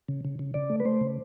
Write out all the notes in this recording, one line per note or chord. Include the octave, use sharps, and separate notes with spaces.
C#3
C#3
C#3
C#3 D5
A3
B4
A3 C5
C#3